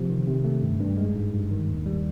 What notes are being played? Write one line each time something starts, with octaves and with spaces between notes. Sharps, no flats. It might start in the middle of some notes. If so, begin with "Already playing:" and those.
Already playing: C3 F3
D#3
C3
A3
G2
G2
G#3
G#2
G2
D#3
D#2
G3